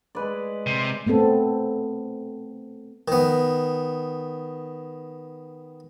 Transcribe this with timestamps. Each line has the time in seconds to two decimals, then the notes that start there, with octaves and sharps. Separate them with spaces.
0.15 G#3 B4 D5
0.66 C3
1.07 A3 B3 C4 A4
3.08 D#3 B3